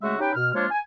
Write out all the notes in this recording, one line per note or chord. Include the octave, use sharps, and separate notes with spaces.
C#3 G#3 A3 F#4 E5
C#4 D#4 G4 B4 G5
B2 F6
F3 G#3 A#3 D4 F4 C#5
G#5